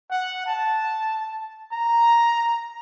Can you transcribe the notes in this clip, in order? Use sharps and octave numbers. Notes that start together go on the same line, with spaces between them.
F#5
A5
A#5